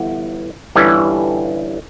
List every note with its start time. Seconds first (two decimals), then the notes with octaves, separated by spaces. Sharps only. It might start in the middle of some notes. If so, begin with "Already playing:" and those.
Already playing: G1 E3 B3
0.75 G1 G2 E3 G3 C#4